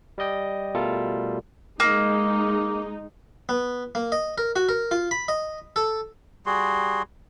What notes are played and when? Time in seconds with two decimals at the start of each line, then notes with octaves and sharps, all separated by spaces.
0.18 G3 D5 D#5 G5
0.74 B2 G3 A3 F4 A4 A#4
1.80 G#3 A#3 D#4
3.49 B3
3.95 A#3
4.12 D#5
4.38 A#4
4.56 F#4
4.69 A#4
4.91 F4
5.11 B5
5.28 D#5
5.76 A4
6.46 G3 F#4 G#4 C6